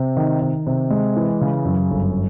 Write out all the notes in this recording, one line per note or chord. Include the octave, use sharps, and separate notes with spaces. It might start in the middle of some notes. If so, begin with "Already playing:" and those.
Already playing: C3
D#3
D#3
C3
G#3
E3
C#3
F#2
G1